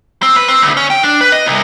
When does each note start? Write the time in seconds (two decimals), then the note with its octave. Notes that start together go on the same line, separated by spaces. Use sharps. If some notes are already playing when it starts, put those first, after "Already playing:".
0.23 C4
0.36 B4
0.48 C4
0.62 D2
0.77 C#4
0.90 G5
1.03 D4
1.21 B4
1.32 D#5
1.46 C2